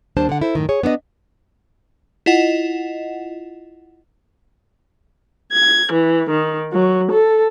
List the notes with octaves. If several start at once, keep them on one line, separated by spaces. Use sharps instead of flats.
D#2 G3 D4 C5 A5
D3 F#5
E4 A4 C5
F#2 A2 D#3
G#4 C#5
B3 D4 C#5 D#5
E4 F4 D#5 F#5
G#6
E3
D#3
F#3
A4